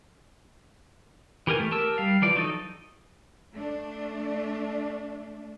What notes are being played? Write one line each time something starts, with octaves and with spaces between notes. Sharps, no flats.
E3 G4 A#4 G#5
A3
G4 A#4 A5 E6
G3 F5
E3 F3 D5
F#3 D#4 A4 D#5
A3 D4